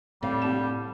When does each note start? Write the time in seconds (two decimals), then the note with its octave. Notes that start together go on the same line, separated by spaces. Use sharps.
0.23 A2 G3 C4 F5
0.42 C2 A5 E7